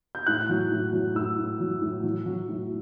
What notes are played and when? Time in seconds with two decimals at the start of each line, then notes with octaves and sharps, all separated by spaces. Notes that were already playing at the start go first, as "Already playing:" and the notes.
0.15 G6
0.26 A2 F#6
0.49 F#3
0.71 A2
0.93 F#3
1.15 A2 E6
1.38 A2
1.60 F#3
1.81 A2
2.03 F#3
2.26 F#3
2.48 A2